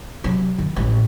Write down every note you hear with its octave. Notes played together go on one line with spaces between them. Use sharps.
C3 F#3
D#3
A1 G#3